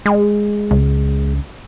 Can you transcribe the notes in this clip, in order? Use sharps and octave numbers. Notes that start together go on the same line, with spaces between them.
G#3
C#2